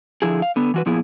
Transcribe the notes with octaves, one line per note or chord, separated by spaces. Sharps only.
D3 F3 E4 G#4
F5
D3 B3
E3 F#4 B4
A#2 F3 B3 E4 G#4